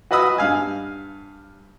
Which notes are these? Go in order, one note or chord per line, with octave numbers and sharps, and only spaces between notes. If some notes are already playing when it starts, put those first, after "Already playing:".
F#4 B4 D#5 B5 D#6 E6
G2 F5 G#5